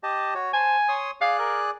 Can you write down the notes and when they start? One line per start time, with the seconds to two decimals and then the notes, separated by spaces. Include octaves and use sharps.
0.03 G4 D#5 A5
0.35 F#4 C#5
0.53 C5 G#5 A5
0.88 C#5 C6 D#6
1.21 G#4 D5 F5 F#6
1.39 A#4